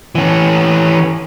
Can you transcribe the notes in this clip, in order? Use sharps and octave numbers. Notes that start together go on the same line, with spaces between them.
E3 C#4